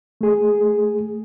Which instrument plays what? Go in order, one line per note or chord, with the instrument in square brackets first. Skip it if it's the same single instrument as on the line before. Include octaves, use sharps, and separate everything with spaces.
[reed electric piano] A3 G#4